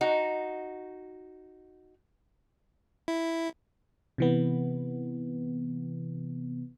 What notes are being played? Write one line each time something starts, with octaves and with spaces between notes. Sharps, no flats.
D#4 F#4
E4
C3 E3 B3